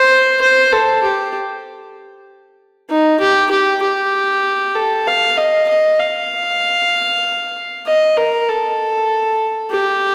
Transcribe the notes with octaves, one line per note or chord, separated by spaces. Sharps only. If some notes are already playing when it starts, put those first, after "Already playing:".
Already playing: C5
C5
A4
G4
D#4
G4
G4
G4
A4
F5
D#5
D#5
F5
D#5
A#4
A4
G4